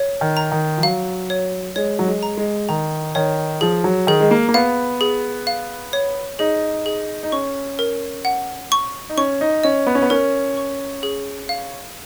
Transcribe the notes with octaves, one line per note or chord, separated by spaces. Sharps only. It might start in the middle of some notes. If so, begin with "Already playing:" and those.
Already playing: C#5
D#3
A#5
D#3
F3
F#3 F5
C#5
G#3 C#5
F#3
G#3
A#5
G#3
D#3 A#5
D#3 C#5
F3 G#4
F#3
D#3 G#4
G#3
A#3
A#3
B3 F5
G#4
F5
C#5
D#4 G#4
G#4
D#4
C#4 C#6
A#4
F#5
C#6
D#4
C#4 C#6
D#4
C#4 D#5
B3
C#4
B3
C#4 A#4
C#6
G#4
F5